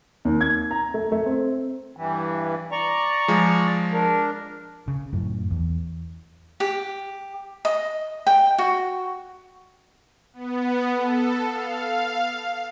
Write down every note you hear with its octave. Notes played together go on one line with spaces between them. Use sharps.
D#2
G#6
A#5
A3
A3
C4
G2 E3
D5 A#5 C#6
F3 G#3
D4 A#4
C#3
F#2 A2
E2
G4
D#5
G5
F#4
B3
A4
F5